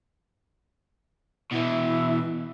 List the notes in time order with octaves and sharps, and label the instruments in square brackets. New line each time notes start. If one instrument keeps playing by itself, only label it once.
[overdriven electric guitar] B2 E3 [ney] E4